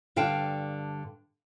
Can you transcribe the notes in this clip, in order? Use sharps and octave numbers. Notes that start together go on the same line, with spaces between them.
G2 D3 F5 G5 A5